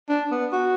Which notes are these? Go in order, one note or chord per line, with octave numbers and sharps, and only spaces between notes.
D4
B3
F#4